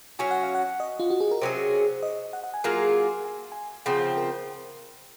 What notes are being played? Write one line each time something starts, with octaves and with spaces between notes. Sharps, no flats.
F#3 C#4 F#4 G#5
F#5
F5
F#5
D#5
F4
F#4
G#4
A#4
C3 F#3 C#4 G#4 C5
D#5
F#5
F#5
G#5
F#3 A#3 F4 G#4
G#5
G#5
C#3 F3 C4 F#5
F5
A#4